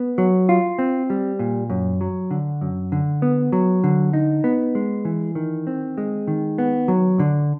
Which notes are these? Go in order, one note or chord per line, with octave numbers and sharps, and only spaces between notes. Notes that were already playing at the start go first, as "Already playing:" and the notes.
Already playing: B3
F#3
F4
C4
G3
A#2
F#2
F#3
D3
F#2
D3
B3
F#3
D3
D#4
B3
G#3
E3
D#3
C4
G#3
D#3
B3
F#3
D3